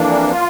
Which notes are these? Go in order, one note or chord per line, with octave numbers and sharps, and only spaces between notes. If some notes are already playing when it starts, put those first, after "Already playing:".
Already playing: F2 E3 A#3 D4
F4